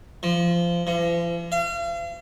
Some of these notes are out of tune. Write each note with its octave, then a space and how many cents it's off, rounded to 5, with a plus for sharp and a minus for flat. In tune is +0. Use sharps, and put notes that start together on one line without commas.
F3 -20
F3 -45
F5 -40